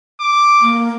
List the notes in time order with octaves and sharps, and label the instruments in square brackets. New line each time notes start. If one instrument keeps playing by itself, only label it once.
[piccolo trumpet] D6
[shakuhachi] A#3